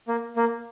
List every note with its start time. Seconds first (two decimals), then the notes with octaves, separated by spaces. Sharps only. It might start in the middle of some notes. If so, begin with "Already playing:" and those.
0.08 A#3
0.36 A#3